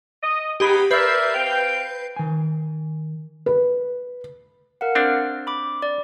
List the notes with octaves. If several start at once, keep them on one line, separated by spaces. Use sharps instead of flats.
D#5
B3 D#4 G4 G#4 B5
A#4 B4 D5 E5 G6 C7
C4 F5 G5
D#3 G#5
B4
A#4 F5 F#5
C4 D4 F6
B5 D6
D5